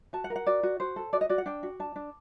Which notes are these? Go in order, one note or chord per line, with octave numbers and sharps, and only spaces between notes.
F#4 A5
F#5
A#4
F#5
F#4 D5
F#4
F#4 C5
A4
F#4 D5
D#5
F#4 D5
F#5
D4 G5
F#4
D4 A5
D4